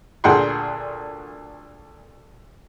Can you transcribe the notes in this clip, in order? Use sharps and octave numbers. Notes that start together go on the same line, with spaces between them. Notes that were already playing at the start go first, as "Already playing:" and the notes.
D2 A#2 G#4 F#5 G5 C6